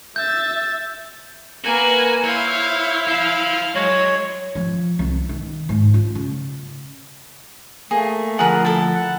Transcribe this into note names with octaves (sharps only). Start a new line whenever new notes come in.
E5 G6 A6
A#3 F#4 A#4 B4 G#5
E4 C5 C#5 F5
C5 F5 A5
F#3 G#3 F#4 C#5
F3
C2
D#3
G#2
F4
C#3
A3 A#3 G#4
D2 F3 G#4 A#4 F#5 B5
E4 A4 A5
F#5